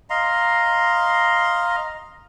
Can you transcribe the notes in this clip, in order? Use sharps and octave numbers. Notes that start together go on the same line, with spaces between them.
D#5 F5 A#5 C6